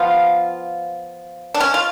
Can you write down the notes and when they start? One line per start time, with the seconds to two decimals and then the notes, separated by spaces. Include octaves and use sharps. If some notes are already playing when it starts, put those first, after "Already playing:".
Already playing: F3 B3 F4
1.54 D4
1.60 C#4
1.74 F4